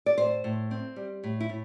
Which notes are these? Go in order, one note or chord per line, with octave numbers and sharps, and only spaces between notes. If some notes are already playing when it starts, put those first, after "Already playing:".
D5
A2 C5
A2
C4
G3
A2
E4
A2